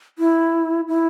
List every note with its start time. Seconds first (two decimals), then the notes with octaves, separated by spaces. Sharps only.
0.19 E4
0.88 E4